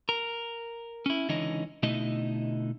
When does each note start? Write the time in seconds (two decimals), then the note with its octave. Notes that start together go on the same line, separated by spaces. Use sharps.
0.09 A#4
1.06 C#4 E4
1.29 C#2 D3 E3 C#4 D#4 D#5
1.83 B2 D3 A3 D#4 E4 D#5